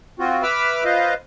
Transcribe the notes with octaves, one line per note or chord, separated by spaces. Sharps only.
C4 F4 F#4
B4 E5 B5 D6 E6 F6
F4 B4 C5 D#5 F5